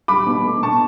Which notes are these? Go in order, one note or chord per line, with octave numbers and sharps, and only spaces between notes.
G3 B5 D6
B2
A3
B2 A5 C#6